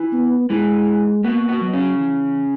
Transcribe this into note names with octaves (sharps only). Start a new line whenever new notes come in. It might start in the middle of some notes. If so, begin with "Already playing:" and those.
Already playing: E3
B3
E3 G#3
B2 A#3 B3
B2 B3
F#3
C#3 C#4
E3